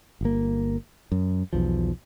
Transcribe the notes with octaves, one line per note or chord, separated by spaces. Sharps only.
G1 A#3
F#2
B1 E2 F3